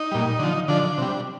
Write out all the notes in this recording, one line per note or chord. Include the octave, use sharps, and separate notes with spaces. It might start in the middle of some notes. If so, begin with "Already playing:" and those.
Already playing: D#4
A#2 G3
D3 F3
D3 F3 D4
C3 G3